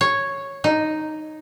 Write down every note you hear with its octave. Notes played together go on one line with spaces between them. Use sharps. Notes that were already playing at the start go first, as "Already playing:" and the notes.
C#5
D#4